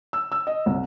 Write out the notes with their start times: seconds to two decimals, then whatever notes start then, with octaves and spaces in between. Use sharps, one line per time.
0.13 E6
0.32 E6
0.47 D#5
0.66 C2